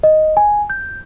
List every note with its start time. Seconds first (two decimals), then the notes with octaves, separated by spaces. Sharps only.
0.03 D#5
0.37 G#5
0.70 G6